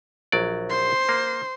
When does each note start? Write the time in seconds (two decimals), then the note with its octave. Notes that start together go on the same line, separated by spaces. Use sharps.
0.32 A#1 F#3 D5
0.70 C5 C6
1.09 A#3